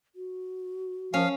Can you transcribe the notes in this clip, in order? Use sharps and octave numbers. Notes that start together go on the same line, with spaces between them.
F#4
F3 C#4 F5